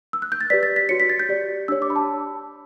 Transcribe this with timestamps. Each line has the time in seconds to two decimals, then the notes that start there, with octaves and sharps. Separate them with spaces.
0.13 E6
0.22 F#6
0.32 G6
0.41 A6
0.50 G4 B4 D5 B6
0.63 A6
0.76 B6
0.89 F#4 C#5 C#7
1.00 B6
1.09 A6
1.19 G6
1.29 G4 D5
1.68 D4 G4 C#5 E6
1.82 D6
1.90 B5
1.96 A5